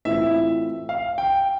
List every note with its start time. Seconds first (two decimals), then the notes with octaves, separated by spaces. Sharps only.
0.05 A2 E3 A3 C4 F4 E5
0.89 F5
1.18 G5